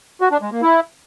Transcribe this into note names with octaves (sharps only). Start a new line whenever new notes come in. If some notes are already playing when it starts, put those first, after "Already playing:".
F#4
D4
G#3
A#3
E4